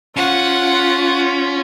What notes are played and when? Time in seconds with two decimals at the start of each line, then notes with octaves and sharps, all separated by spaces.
0.16 C#4 F4 F#5